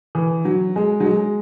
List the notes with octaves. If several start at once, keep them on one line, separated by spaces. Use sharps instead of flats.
E3
F#3
G#3
F#3
G#3